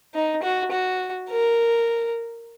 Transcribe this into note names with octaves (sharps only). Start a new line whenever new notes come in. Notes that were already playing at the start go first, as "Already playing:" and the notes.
D#4
F#4
F#4
A#4